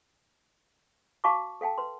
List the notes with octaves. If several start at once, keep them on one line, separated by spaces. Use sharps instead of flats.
F#4 F5 A5 B5 C#6 D6
A4 F5 G5 A5
B4 C6